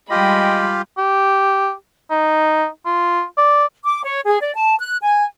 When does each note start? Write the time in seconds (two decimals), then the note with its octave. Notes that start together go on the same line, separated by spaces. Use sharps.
0.11 G3 G#3 F4 G4 D#5 G5 B5
0.98 G4
2.10 D#4
2.85 F4
3.38 D5
3.85 D6
4.04 C#5
4.26 G#4
4.41 D5
4.56 A5
4.78 F#6
5.02 G#5